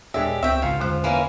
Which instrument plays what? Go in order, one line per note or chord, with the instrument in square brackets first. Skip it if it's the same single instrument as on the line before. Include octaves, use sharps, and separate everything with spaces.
[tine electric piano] D#2 A#2 C#5 [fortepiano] G#3 D4 E5 [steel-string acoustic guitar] G4
[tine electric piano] C#2 C#6 [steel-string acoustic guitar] C4 G5 [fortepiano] E5
[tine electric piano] A1 C#3 C7 [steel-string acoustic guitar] G#2 [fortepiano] F4 F5
[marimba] E2 D3 F#6 [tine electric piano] G#3 C5 C6
[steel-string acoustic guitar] E3 A#3 C#4 [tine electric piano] G#5